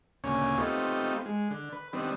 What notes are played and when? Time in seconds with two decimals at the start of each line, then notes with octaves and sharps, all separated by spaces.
0.24 D2 A#2 C#3 C#5 G#5
0.58 A3 B3 C4 D#4 F4 G4
1.26 G#3
1.50 D3
1.73 B4
1.93 D#3 G3 B3 C4 D4